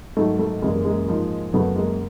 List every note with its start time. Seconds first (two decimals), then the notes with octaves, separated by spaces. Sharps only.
0.17 G#2 D#3 F#3 A3
0.39 A3
0.62 F#2 C#3 E3 G3 G#3 A#3
0.85 G#3 A#3
1.08 G#2 F3
1.53 F#2 C#3 F#3 A3 B3
1.76 G#3 A#3